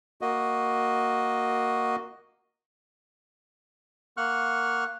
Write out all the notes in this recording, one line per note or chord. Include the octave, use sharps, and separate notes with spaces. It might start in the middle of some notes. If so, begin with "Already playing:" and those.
A#3 F#4 D#5
A#3 F#5 C#6 F6 F#6